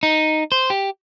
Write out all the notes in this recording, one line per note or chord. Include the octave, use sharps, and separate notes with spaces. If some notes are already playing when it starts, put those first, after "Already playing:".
D#4
C5
G4